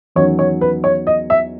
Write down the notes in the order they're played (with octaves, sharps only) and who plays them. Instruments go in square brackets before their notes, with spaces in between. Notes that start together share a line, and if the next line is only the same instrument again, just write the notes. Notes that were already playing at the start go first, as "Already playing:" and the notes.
[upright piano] E2 D#3 F#3 C#4 C#5
C#5
B4
C#5
D#5
E5